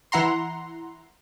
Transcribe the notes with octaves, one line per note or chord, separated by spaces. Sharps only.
E3 E4 F#5 A#5 C6